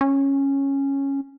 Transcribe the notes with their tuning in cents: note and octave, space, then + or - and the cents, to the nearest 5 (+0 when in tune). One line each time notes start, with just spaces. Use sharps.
C#4 -10